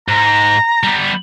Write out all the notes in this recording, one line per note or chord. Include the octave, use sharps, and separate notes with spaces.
G#2 A#5
G3 B3